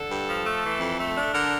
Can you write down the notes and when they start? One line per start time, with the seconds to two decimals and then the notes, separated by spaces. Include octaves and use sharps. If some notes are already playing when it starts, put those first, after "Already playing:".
Already playing: D3 A4
0.10 G2
0.27 F3
0.45 A3
0.63 E3
0.80 F2
0.99 A3
1.16 D4
1.33 D3 A#4